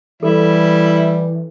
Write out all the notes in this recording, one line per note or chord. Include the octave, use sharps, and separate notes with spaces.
E3 G3 E4 A4